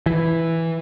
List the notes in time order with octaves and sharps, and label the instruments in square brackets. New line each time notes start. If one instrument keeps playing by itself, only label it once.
[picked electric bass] E3